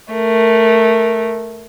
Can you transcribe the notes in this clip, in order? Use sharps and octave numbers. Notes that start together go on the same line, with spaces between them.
A3 A#4